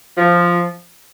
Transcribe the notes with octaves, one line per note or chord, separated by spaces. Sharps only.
F3